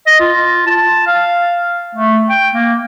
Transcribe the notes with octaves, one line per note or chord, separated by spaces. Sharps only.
D#5
F4
A5
F5
A3
G5
A#3